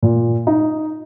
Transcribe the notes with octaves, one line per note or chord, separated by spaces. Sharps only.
A#2
D#4